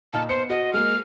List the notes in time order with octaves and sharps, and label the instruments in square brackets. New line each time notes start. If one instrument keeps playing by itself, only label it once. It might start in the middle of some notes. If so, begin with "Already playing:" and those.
[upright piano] A#2 D#4 F6 [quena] A5
[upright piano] B3 C#7 [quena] C5
[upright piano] F#4 [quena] D#5
[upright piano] G#3 A#3 [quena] F6